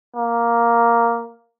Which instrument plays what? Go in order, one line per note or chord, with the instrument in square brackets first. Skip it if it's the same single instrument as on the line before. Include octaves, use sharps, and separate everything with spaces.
[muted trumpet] A#3